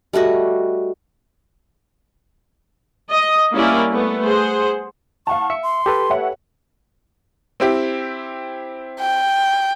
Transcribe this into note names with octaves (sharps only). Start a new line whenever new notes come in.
G3 A3 F#4 D#5
D#5
G3 A#3 C#4 E4 A#4 D5
A3 B3
G#4 C5 F#5
F5 F#5 A5 C#6
E5 C#7
C6
G4 A4 B4
C#5 E5 F#5
C4 E4 G4
G5